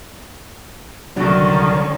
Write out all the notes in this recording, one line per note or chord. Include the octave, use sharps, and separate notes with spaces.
C2 D3 D#3 F#3 C#4 D4 D5 C#6